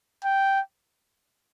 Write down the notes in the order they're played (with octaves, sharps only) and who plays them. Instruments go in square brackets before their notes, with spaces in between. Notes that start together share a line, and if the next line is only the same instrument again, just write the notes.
[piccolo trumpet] G5